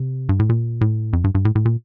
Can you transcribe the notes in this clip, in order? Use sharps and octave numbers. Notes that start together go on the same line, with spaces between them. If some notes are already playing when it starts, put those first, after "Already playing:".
Already playing: C3
G2
A2
A#2
A2
F2
G2
G2
A2
A2
A#2